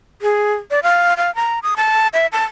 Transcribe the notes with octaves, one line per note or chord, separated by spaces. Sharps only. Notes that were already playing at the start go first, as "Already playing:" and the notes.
G#4
D5
F5
F5
A#5
D#6
A5
E5
A5